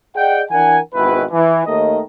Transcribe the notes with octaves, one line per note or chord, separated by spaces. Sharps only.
G#4 D5 D#5 F#5 G5
E3 D4 A#4 F#5 G#5
G#1 G#2 B2 D#3 E4 B4
E3
D#2 D#3 A3 D#5